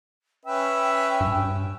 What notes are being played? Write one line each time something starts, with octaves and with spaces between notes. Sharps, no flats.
C#4 B4 E5 G5
G2